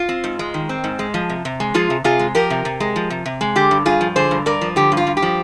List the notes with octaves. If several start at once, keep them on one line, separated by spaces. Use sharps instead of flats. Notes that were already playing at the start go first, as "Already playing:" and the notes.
Already playing: F4
C4
G#2
G#3
D#3
C4
G#2
G#3
F3
C3
C3
G#3
F3 F4 G#4
C3
C3 F4 G#4
G#3
F3 G4 A#4
C3
C3
G#3
F3
C3
C3
G#3
D3 G4
G2
G2 F4 G#4
F3
D3 G#4 C5
G2
G2 A#4 D5
F3
D3 G4
G2
F4
G2
G4
F3